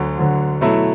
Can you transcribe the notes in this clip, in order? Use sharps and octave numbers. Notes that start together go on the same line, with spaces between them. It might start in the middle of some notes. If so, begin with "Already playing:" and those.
Already playing: D2 D3 F#3
D2 D3 F#3
B2 F#3 A3 E4